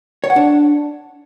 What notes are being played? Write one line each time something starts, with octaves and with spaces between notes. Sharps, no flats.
C#5
F#5
D4